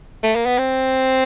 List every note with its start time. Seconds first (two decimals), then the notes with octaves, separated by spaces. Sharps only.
0.23 A3
0.35 A#3
0.46 B3
0.58 C4